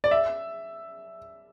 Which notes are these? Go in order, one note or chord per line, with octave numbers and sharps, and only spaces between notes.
D5
E5